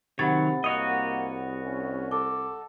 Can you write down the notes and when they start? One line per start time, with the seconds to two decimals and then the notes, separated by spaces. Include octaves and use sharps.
0.19 C3 D#3 F#3 C#5 F#5 B5 A6
0.64 C2 A#3 F#4 C#5 D#5
1.66 C#4
2.11 A4 D6